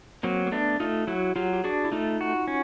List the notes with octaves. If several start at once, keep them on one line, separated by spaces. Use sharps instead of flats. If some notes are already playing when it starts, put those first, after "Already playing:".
F#3 A#3 C4
A#3
A3 B3 D4
A3 D#4 F4
F#3 E4 F#4
F#3 F4 G4
G4
D4 F#4 G#4
E4
A3 D#4 F4
F#4
C#4